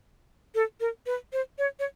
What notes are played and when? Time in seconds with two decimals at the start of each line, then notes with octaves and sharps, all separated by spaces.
0.55 A4
0.81 A#4
1.06 B4
1.33 C5
1.58 C#5
1.79 C#5